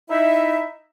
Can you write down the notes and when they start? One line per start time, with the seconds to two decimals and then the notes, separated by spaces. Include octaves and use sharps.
0.09 D#4 E4 E5